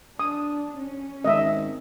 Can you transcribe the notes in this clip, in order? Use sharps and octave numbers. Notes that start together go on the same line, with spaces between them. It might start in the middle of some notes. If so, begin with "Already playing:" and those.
D4 D#6
C#4
G#1 D#5 E5